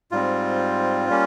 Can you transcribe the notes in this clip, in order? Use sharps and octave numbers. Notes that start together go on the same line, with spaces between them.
G#2 G3 C4 F4
G3 A#3 C#4